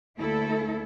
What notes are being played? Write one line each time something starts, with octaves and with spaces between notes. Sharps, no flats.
D2 A3 A#3 E4 A4